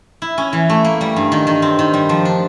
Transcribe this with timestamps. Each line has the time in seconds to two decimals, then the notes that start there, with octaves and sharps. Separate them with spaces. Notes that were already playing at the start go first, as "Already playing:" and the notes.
0.22 E4
0.38 C#4
0.53 E3
0.70 A3
0.85 A#3
1.01 G3
1.16 G2
1.32 D#3
1.47 D#3
1.62 C4
1.79 D#3
1.93 G3
2.09 F3
2.25 D4